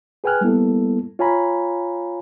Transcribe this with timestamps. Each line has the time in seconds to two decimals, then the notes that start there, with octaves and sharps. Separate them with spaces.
0.24 G#4 B4 G5 G#5 F6 F#6
0.41 G3 A#3 B3 E4 A4
1.19 F4 C#5 F5 G#5 A#5 B5